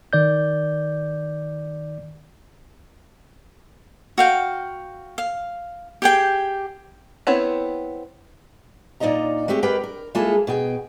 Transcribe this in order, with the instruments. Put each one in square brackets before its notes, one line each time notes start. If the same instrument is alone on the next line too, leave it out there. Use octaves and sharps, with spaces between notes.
[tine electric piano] D#3 D5 G6
[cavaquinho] F#4 F5 G5
F5
G4 G#4 G5
[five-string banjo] B3 C4 E4 C#5
[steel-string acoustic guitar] A#2 G#3 D#4 D5 D#5 A#5
G#3 A3 C4 G4
G#3 G4 A#4 B4 G5
A#4
G#3 A#3 E4 F4 G#4 A4
B2 G#4 G5